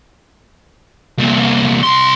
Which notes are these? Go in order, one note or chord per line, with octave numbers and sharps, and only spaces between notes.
C2 A#2
C2 C6